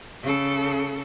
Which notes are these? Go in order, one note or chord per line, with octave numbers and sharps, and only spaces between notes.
C#3 A4